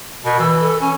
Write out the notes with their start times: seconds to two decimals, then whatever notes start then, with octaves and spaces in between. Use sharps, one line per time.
0.25 B2 A#4
0.40 E3 E6
0.60 A4
0.81 C#4 G#5